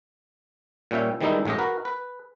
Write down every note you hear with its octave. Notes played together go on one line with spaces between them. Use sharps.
A#2 G3 C#4 E5 G5
D#3 E3 G3 G#3 D#4 E4
A1 A2 G#3 G4 D#5
F#4 A#4 B4
B4